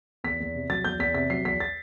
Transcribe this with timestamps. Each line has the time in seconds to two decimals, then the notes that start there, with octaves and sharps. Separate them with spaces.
0.24 E2 B6
0.40 E2
0.55 C3
0.70 F#3 A6
0.85 E2 G6
0.99 E2 B6
1.14 C3 B6
1.30 F#3 C7
1.45 E2 B6
1.60 A6